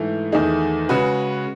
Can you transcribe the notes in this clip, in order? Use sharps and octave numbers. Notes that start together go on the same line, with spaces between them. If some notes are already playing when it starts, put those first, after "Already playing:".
Already playing: G#2 E3 A3
E2 D#3 A3 D#4 G#4
C#3 G#3 C#4 F#4 B4